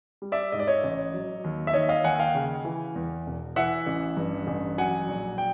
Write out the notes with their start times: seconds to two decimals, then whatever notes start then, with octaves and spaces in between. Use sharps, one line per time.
0.22 G3
0.32 D5 E5
0.52 G#2 D#5
0.60 D5
0.67 C#5 D#5
0.84 A1
1.14 F#3
1.44 D#2
1.67 E5
1.73 D#3 C#5 D#5
1.89 D#5 F5
2.04 D#2 F#5 G#5
2.19 F5 G5
2.35 C#3
2.65 E3
2.95 E2
3.27 E1
3.56 E3 E5 F#5
3.87 A1
4.17 G2
4.47 A1
4.78 F#3 F#5 G#5
5.08 A#1
5.38 G5